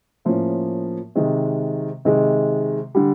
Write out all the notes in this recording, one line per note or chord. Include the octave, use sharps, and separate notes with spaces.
A2 F3 A#3 C#4
C3 D#3 G#3
C3 D#3 G#3
D3 G3